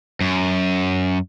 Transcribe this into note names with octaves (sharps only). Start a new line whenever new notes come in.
F#2